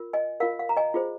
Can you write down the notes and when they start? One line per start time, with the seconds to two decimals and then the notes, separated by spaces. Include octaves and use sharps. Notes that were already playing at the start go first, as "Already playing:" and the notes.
Already playing: F4 A#4
0.13 D#5 G#5
0.40 F4 A#4 F5
0.59 F5
0.69 A#5
0.77 D#5 G#5
0.94 F4 G#4 C5